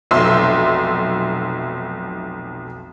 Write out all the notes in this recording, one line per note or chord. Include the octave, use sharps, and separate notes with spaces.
F1 B1 E5 C6 E6